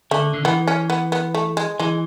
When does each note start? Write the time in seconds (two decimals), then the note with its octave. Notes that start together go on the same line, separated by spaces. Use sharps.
0.11 D3 A3
0.34 D3
0.45 E3 B3
0.68 C#4
0.90 B3
1.12 B3
1.35 A3
1.57 G#3
1.80 E3 G#3